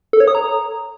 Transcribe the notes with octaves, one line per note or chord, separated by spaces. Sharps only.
A4
C#5
D#6
A#5